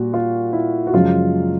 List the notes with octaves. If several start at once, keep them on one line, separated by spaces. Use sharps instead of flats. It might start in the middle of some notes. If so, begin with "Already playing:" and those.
Already playing: A#2 G3 F#4
F4
E4
F#4
F#2 C#3 F3 G#3 F4